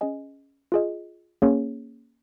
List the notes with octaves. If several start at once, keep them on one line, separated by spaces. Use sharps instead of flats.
C#4 G#4 D#5 G#5
F4 G#4 D#5
A#3 C#4 G#4 C#5